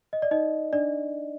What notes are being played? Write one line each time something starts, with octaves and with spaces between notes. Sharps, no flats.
D#5
D5
D#4 D#5
D4 D5